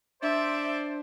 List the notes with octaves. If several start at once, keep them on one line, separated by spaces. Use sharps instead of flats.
D4 C5 D5 E5